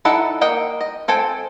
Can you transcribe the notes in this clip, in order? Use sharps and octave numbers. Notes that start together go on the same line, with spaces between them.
D#4 E4 A4 F#5
A#3 D#5 F#5 G5
D#5
C4 A4 G5 G#5